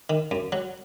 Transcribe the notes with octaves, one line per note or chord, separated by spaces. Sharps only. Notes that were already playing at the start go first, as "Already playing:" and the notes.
D#3
F#2
F#3